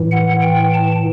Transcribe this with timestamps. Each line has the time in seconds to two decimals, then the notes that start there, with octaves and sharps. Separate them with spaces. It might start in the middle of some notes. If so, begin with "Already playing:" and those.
Already playing: A2 E3
0.11 F#5
0.42 G5
0.73 A5